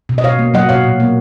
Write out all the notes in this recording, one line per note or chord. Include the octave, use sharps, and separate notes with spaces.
B2
D#5
B2 C#5 F5
A#3
F#3 D#5 F#5
B2 C#5 F5
A#2
A#3